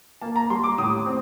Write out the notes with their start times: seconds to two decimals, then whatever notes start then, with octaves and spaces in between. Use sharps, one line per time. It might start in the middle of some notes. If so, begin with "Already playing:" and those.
0.21 A#3 A5
0.36 A#5
0.50 G3 C6
0.64 D6
0.78 A2 D#6
1.06 C4